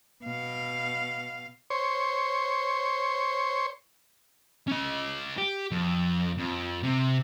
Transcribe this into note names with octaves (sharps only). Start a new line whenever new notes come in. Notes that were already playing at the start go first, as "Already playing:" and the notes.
B2 F5
C5 C#5
C#4 D#5
G4
F2
F2
C3